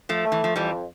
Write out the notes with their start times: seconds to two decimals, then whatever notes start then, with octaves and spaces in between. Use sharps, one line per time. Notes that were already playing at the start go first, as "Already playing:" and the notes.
0.09 F3 A3
0.25 A3
0.32 E3
0.44 F3
0.55 F2 E3 G3